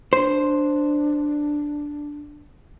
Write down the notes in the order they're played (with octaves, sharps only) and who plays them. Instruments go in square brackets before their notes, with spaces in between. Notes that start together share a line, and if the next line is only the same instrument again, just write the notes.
[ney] D4 [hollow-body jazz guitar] C5